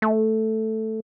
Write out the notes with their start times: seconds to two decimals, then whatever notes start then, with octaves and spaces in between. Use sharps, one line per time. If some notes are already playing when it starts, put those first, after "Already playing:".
0.02 A3